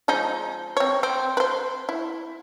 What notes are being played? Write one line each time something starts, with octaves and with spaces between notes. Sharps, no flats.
F3 G#3 D#4
C4 C#5
C4
B4 C5
E4